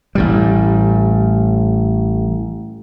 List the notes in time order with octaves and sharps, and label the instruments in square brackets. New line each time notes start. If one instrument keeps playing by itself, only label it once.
[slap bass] A1 A2 G3